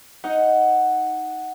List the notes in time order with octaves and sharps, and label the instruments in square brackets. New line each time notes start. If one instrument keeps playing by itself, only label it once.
[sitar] D#4 [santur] F#5